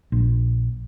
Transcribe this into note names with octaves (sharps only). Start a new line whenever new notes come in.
A#1